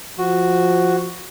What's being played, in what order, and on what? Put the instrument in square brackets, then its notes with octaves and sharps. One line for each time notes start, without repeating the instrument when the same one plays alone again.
[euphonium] F3 [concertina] F#4